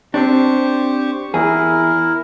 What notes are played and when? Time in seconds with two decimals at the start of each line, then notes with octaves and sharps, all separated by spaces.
0.14 C4 D4 G4 C5 C#6
1.34 E2 E4 G#4 A#4